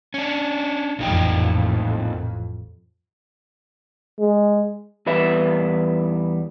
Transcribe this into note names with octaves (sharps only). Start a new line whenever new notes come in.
C#4 D4
A1 F2 A#2 D#4 G5
G#3
E2 G3 B4 E5